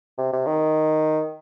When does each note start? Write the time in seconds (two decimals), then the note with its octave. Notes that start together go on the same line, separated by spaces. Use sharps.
0.18 C3
0.33 C3
0.46 D#3